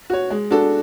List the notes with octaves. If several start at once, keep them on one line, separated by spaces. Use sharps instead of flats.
F#4 C#5
G#3
D4 F#4 A4